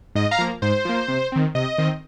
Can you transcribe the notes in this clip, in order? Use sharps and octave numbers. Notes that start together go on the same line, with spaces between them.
G#2 D#5
F5 A#5
F3 A#3
G#2 C5
F3 A#3
C3
D#3 C4
C3 D#5
D#3 C4